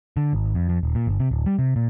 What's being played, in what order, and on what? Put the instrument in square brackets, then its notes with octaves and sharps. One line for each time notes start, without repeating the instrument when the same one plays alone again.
[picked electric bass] D3
G#1
F2
F2
D#1
A#2
G1
C3
D1
G3
C3
A#2